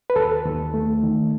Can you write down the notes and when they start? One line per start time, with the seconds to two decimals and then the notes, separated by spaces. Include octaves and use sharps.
0.10 B4
0.16 D#2 A4
0.45 D#2
0.74 A3
1.03 D#3